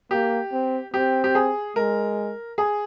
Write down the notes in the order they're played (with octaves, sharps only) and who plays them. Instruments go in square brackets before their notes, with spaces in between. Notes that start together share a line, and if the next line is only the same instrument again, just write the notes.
[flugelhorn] A#3 [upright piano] G4
[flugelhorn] C4
[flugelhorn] C4 [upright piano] G4
[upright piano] G4
G#4
[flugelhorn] G#3 [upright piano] A#4
[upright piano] G#4